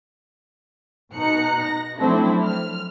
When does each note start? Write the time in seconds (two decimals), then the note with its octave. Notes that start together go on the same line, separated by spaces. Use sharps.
1.12 B2 D#4 A#5 F#6 C#7
1.63 A#6
1.98 F3 F#3 A3 C4 D4 E4
2.43 F6